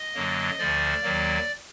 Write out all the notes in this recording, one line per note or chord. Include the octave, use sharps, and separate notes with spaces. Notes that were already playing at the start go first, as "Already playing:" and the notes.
Already playing: D#5
F#2 D3 F#3 A#3
D2 D3 F3 D5
D#2 D#3 F#3 A#3